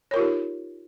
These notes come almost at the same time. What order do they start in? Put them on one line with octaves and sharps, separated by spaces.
C#5 A#4 F4 G4 D#4